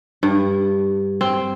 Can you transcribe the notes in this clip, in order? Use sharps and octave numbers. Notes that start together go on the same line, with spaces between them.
G2
C4